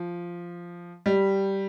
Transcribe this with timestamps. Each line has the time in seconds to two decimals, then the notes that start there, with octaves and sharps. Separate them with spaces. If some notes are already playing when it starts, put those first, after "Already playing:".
Already playing: F3
1.06 G3